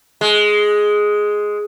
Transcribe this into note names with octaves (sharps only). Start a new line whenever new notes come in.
G#3